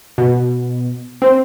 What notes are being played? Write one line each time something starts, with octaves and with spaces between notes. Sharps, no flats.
B2
C4